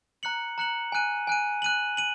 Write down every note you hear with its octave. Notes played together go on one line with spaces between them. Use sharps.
A#5 F#6 C#7 F#7
A#5 F#6 C#7 F#7
G#5 F#6 D#7
G#5 F#6 D#7
F#6 D#7 F#7
D#7 F#7